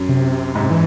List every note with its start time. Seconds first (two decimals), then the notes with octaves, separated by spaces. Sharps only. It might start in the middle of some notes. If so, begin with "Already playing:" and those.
Already playing: F#2
0.09 C3
0.55 G#2
0.71 E3